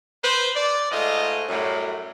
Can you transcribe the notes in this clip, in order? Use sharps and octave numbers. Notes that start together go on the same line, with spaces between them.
B4 C5
D5
G#2 A3 F4 D#5
F#2 A2 F#3 G3